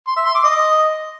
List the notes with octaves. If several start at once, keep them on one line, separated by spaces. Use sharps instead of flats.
C6
E5
C6
D6
D#5